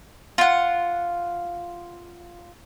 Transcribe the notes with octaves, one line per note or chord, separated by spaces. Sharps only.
F4 F#5